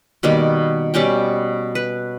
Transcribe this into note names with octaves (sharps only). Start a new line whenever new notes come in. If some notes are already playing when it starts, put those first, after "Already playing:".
B2 D#3 G3 A#3
B2 G3 C#4 G5
B4